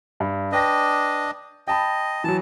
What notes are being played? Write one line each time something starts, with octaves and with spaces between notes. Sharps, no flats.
G2
D4 B4 D#5 G5 A#6
D#5 G5 A5 B5
E3 F#3 A5